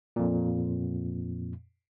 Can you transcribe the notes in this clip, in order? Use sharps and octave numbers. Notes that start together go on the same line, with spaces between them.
F2 A#2